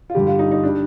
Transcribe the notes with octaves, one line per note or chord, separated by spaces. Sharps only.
F4
G2 D3 G3 G4
F4
D#4
D#4
G3 D4